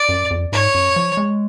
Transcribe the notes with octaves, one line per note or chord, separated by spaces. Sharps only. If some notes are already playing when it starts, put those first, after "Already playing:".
Already playing: D5
F#2
F2
G#2 C#5
F#2
F3
G#3